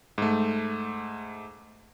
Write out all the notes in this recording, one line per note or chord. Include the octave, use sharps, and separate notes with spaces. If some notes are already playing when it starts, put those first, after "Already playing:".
G#2 A3